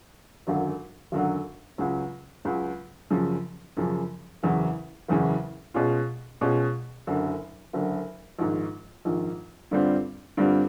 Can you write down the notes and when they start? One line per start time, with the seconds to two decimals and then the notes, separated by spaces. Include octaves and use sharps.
0.47 G#1 F#2 D3 F#3
1.12 G#1 F#2 D3 F#3
1.78 C#2 C#3 F#3
2.45 C#2 C#3 F#3
3.10 F#2 C#3 F3
3.77 F#2 C#3 F3
4.43 F#1 E2 C#3 F#3
5.08 F#1 E2 C#3 F#3
5.74 B2 G#3 C#4 F4
6.41 B2 G#3 C#4 F4
7.07 F#1 F#2 D3
7.73 F#1 F#2 D3
8.39 A#1 G#2 D#3
9.05 A#1 G#2 D#3
9.71 G2 D3 G3 C4 F4
10.37 G2 D3 G3 C4 F4